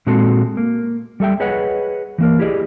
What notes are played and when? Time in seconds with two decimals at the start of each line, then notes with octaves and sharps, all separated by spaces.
0.07 A#2 G#3 C4 F#4 A4
0.57 A#3
1.20 G3 A4 E5 G5
1.40 G#4 B4 C#5 D#5 F#5
2.18 E3 A#3 A#4
2.39 E4 G4 G#4 D5 D#5